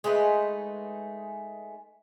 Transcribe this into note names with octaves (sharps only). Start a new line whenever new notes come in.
G#3 A3 D#4 B4